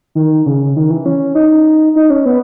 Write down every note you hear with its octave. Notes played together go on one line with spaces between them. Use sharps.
D#3
C#3
D#3
E3
C#4
D#4
D#4
C#4
B3